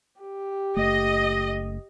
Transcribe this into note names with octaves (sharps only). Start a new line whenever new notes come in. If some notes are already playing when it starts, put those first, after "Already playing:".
G4
F#1 A3 D#5